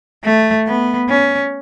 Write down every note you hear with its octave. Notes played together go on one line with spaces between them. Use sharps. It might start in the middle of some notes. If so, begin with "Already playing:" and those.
A3
B3
C#4